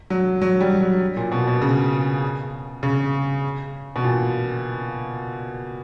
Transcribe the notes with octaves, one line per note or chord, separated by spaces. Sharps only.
F#3
F#3
G3
F#3
A#2
B2
B2
C#3
C#3
B2
A#2